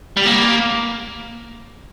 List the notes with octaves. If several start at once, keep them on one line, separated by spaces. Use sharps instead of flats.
G3
A#3